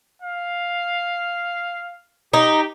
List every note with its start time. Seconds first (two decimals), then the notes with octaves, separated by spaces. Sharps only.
0.22 F5
2.33 D#4 G4